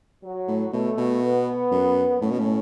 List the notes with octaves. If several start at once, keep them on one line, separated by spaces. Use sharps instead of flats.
F#3
A2
B2 A3
B2
B3
F#2
A2 C#4
B2
A2